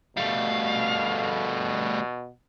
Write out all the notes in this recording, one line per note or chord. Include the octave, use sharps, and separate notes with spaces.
B2 G3 A3 F5